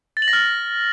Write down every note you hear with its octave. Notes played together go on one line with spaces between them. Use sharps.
A6
F#7
A#6
F6